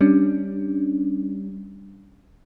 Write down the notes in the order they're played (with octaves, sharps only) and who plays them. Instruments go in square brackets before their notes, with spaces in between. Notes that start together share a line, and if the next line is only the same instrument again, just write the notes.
[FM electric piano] G3 C#4 D4